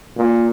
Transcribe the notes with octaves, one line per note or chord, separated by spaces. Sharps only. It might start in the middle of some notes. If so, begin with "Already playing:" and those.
A#2